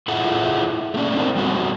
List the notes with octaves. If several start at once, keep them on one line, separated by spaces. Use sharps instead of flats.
E4 F4 G#4 A4 E5 F#5
A3 A#3 C#4 D4
C4 D#4 F#4 A4 A#4 C5
G3 B3 F#4 A4